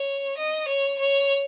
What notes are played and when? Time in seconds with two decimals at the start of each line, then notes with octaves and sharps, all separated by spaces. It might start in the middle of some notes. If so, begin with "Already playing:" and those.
Already playing: C#5
0.38 D#5
0.68 C#5
0.99 C#5